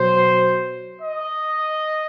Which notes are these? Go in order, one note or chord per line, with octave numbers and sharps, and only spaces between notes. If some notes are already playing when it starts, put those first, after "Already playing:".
Already playing: B2 F#3 C5
D#5